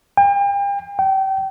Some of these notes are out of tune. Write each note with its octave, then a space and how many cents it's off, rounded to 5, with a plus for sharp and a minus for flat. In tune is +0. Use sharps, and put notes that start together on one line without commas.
G5 +40
G5 -30